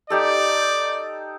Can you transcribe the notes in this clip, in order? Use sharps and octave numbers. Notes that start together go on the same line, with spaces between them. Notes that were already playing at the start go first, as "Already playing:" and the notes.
D#4 G4 A4 D5